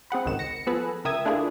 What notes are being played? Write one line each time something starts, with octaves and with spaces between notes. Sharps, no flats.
C4 G#4 F#5 B5
G#1 C#2 D#3 E7
A#6 C#7
F3 B3 G#4 A4 B4
C#2 A#4 E5 G5 D#6 G#6
A3 D4 E4 F4 G#4 A#4